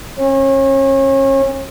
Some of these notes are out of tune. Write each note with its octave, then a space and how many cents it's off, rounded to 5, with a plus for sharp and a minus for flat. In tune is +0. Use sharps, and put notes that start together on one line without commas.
C#4 -35